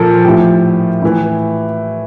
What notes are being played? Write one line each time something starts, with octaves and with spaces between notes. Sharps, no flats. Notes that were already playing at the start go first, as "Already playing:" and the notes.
Already playing: A#2 F3 A4 A#4
A2 F3 G4
A2 E3